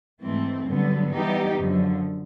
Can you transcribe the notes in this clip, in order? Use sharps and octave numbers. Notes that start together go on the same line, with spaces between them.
G#2 E3 A3 C4
G2 D3 F#3 B3
E3 G3 B3 D#4 G4
F#2 D3 F3